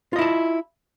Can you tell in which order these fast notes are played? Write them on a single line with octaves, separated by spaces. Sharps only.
F4 D#5 E4 A5